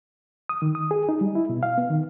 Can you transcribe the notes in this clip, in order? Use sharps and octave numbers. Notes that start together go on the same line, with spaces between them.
D#6
D#3
D#6
G#4
D#4
G3
E4
B2
F5
B3
D#3